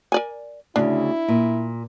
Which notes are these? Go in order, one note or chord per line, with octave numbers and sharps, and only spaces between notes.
A#4 D5 G#5
D2 C#3 D4 E4
A#2